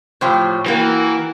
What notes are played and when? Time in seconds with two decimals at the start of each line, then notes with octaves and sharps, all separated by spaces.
0.21 A2 F3 G4 C5 C#5
0.66 E3 A#3 F#4 A#4 G5